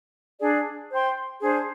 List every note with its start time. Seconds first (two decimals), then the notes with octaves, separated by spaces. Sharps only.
0.40 D4 G#4 D5
0.91 C5 G5 C6
1.40 D4 G#4 C5